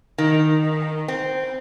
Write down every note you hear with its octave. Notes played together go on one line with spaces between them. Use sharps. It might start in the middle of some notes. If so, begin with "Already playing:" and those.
D#3
C4